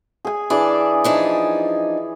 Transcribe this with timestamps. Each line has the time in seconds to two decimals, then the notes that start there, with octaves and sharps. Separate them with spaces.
0.25 G#4 G#5
0.50 E3 D4 G#4 D5
1.04 F3 D4 D#4